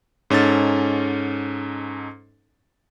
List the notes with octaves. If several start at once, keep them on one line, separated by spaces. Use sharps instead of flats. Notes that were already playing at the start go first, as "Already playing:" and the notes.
G#2 C#4 D#4 A4 A6